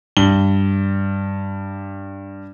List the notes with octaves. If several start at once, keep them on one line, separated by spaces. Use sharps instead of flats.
G2 G7